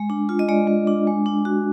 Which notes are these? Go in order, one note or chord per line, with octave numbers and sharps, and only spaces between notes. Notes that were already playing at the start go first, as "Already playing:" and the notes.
Already playing: G#3
D4
F4
D#5
G#3 D5
G#3
D4
G#3
D4
F#4